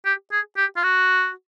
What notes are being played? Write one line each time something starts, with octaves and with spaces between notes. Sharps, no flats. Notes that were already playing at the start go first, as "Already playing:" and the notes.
G4
G#4
G4
F4
F#4